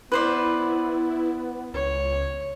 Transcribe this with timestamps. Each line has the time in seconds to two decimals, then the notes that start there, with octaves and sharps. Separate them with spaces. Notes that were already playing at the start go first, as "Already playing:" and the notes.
0.12 B3 E4 B4 C5 D5
1.74 C#2 C#5